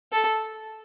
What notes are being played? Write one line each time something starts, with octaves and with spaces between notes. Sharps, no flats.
A4